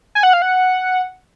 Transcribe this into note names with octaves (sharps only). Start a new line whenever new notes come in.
G#5
F#5
F5
F#5